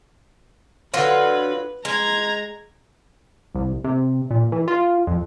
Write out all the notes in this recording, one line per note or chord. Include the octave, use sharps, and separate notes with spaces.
D3 F#3 F4 B4
G#3 A#5 G#6
C2
C3
A#2
E3
F4
F2